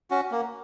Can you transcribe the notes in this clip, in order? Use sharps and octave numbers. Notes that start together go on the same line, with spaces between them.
C#4 F#4
A#3